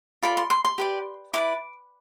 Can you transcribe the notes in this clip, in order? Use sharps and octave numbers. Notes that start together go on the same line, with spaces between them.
F4 A4 D5 B5
C6
C6
C6
G4 B4 D5
E4 B4 D5 D6